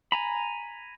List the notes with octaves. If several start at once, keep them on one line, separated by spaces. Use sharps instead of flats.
G#5 A#5 B5